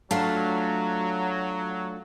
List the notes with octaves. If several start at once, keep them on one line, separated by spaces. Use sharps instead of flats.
F#3 A3 D4 F4 F5 A5